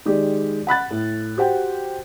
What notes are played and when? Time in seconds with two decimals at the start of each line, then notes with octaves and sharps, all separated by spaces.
0.05 D#3 G#3 G4 D5
0.67 F#5 B5 F#6 A6
0.91 A2
1.37 F#4 G4 C5 F#5 G5